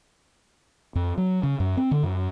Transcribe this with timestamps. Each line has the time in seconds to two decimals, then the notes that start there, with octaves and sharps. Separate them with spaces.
0.95 F2
1.18 F#3
1.43 C#3
1.60 F#2
1.77 C4
1.91 D3
2.03 F#2